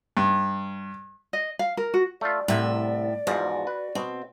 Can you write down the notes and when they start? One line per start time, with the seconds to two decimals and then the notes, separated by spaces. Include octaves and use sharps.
0.17 G2
1.33 D#5
1.59 F5
1.77 A#4
1.94 F#4
2.21 A3 F4 D5
2.48 C2 A2 C3 E5
3.27 E2 G#2 F3 F#4
3.67 B4
3.95 B2 C4